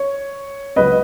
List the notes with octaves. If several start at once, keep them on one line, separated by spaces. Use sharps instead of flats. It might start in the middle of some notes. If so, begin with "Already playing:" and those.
Already playing: C#5
C#2 C#3 F#3 B4 D#5